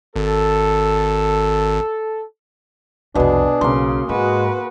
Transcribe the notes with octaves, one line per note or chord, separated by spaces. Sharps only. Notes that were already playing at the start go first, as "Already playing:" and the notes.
G#1 A4
C2 F2 B2 D4 G#4
B1 C#3 A#3 C6
G#2 G#3 F#4 B4